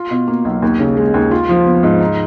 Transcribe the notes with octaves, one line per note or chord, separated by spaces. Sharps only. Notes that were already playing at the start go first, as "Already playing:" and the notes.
Already playing: F4
B2
A#3
B1
D#2
C#3
G#3
D#2
F4
F3
B3
G#2
D#4